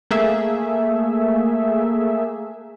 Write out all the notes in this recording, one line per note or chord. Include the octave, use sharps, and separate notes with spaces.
A3 A#3 G#4 E5